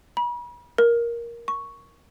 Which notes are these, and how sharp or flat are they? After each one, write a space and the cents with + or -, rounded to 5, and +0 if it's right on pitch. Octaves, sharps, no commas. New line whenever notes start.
B5 -40
A#4 +10
C#6 +5